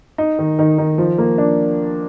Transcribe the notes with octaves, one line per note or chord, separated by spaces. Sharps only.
D#4
D#3
D#3
D#3
F3
A#3
D4